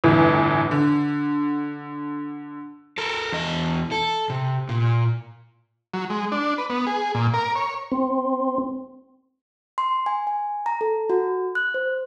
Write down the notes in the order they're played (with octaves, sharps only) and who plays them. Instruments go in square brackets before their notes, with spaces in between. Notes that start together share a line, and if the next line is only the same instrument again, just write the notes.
[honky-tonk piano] G1 E2 A2
D3
[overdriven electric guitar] A4 A#4
E2 D#5
A4
C3
A#2
[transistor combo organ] F#3
G#3
D4
B4
B3
G#4
A#2
A#4
C#5
[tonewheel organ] C4
[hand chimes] C6
G#5
G#5
A#5
A4
F#4
F#6
C5